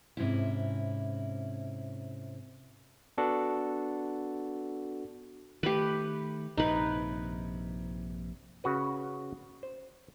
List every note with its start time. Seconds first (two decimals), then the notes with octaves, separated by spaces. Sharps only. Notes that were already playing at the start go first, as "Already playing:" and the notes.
0.17 G#2 C3 C4 C#4 E4
3.18 B3 D4 F#4 A4
5.63 D#3 A3 G4 B4
6.57 A#1 G2 C3 D#4 B4
8.64 C#3 F#4 B4
9.63 C5